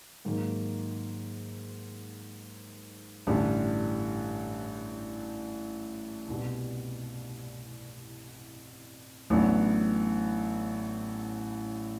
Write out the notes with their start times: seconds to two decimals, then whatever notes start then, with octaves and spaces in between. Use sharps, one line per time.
0.25 G#2 D#3 F#3 A#3
3.27 A1 G2 D3 G3
6.28 C2 B2 G3
9.30 A1 A2 F#3 B3 D4